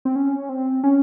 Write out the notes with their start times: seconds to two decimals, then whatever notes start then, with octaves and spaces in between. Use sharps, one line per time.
0.05 C4
0.16 C#4
0.49 C4
0.84 C#4